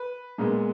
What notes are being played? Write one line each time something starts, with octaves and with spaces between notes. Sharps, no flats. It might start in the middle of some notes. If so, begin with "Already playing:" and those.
Already playing: B4
A#2 G#3 B3